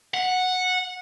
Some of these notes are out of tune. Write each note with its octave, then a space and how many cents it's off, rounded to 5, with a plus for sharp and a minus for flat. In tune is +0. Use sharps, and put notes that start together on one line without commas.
F#5 -10